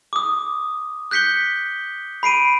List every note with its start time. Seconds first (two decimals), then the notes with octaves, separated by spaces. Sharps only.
0.13 D6 D#6
1.11 F#6 G6 B6 C#7 G7
2.23 B5 C7 D7 D#7